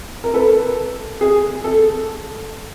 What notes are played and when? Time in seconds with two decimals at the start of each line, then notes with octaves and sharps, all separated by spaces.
0.24 A#4
0.34 A4 B4
1.21 G#4
1.64 A4